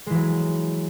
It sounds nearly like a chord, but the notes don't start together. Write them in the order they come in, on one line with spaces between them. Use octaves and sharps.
G#3 E3 F#3